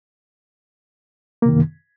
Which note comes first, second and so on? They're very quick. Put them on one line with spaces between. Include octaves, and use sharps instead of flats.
A#3 C3 D#3 F#2